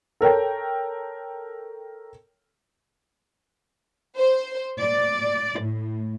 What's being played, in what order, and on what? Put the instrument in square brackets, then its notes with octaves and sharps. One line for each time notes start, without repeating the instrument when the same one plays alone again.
[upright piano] A4 A#4 C#5 G5
[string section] C5
D5
A2